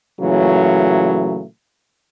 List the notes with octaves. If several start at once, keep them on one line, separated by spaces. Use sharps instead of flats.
A#2 C#3 E3 F#3 A3